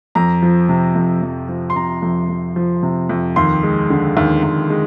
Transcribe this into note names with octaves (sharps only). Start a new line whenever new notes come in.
F2 A#5
F3
C3
F2
F2
F3
C6
C3 A#5
F2
F2
F3
C3
F2
D#2 C6
G#3
D3
D#2
D#2
G#3